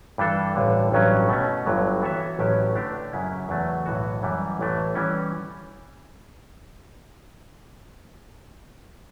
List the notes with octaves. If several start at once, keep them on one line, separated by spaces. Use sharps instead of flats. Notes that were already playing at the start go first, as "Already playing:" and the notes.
G2 E3 G3 D4 A4
A1 G2 D3
A1 G2 F#3 C#4
B2 A3 C#4
G1 G2 D3 F#3
E3 B3 F#4 C#5 E5
A1 A2 F#3 C#4 G4
D3 A3 D4 G4
F#2 C#3 F#3 C#4 E4
E2 C#3 F#3 A3
B1 A2 E3 B3 F#4
F#2 E3 G3
A1 A2 E3 A3
E3 G3 C#4